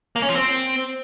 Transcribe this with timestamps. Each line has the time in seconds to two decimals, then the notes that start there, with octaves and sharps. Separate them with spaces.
0.16 A#3
0.22 C#4
0.29 F3
0.35 C4